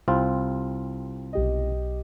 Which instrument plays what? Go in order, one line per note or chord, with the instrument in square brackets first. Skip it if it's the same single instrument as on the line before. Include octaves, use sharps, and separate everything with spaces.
[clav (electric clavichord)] C2 C4 F4
[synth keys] B1 G4 D#5